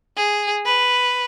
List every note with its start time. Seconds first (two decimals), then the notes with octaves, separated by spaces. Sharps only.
0.17 G#4
0.65 B4